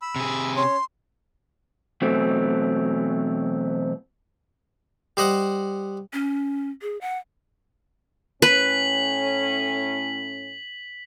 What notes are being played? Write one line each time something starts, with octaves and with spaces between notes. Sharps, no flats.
B5 E6
C3 G#4
C#4 C#5 C6
B2 E3 F#3 A3 C4
G3 C5 D#5 F#5
C#4
G#4
F#5
A2 C#4 B4 B6 F#7